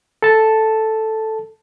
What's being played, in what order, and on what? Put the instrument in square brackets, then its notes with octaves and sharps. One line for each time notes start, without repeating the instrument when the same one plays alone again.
[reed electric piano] A4 A5